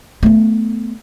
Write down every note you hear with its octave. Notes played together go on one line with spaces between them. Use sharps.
A3 B3